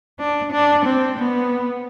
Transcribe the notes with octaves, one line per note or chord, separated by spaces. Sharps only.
D4
D4
C4
B3